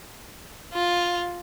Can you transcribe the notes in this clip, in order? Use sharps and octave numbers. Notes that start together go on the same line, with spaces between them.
F4